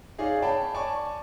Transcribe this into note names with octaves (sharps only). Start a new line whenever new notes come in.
D#4 G#4 C#5 D5 F5
C#5 G5 A5 B5
D5 G#5 A5 C#6 D6